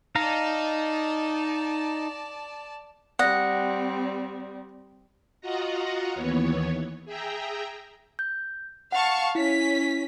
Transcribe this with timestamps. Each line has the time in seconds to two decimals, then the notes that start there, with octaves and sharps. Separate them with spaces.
0.15 D#4 D5 F5 A5 A#5
3.19 G3 C4 D5 F#5 D#6 A#6
5.41 F4 F#4 D#5 F#5 A#5
6.14 D#2 E3 B3 C#5
7.05 G#4 E5 G5 A#5
8.19 G6
8.92 F5 F#5 A5 C#6
9.35 C#4 E4 B6